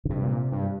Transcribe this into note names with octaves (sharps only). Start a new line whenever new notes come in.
D3
G2 C3
A#2
G2